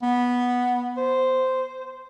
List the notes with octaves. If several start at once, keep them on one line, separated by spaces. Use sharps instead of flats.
B3
C5